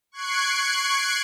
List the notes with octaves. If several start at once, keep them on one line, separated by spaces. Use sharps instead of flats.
C#6 F#6 G#6 C7 D7